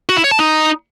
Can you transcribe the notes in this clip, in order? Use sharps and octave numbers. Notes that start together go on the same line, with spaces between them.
F#4
E4
C#5
A5
D#4